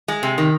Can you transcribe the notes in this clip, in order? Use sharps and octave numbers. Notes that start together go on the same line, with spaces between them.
G#3
C3
D#3